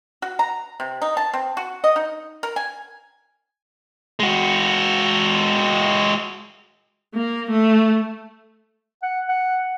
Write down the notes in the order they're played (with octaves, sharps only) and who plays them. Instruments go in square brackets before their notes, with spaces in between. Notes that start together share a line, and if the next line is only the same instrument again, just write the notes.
[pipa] F#4
A#5
C3
D#4
A5
C4
F#4
D#5
D#4
A#4
G#5
[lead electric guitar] G#3 F#4
[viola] A#3
A3
[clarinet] F#5
F#5